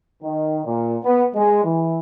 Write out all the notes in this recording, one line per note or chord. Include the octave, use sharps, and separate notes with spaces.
D#3
A#2
B3
G#3
E3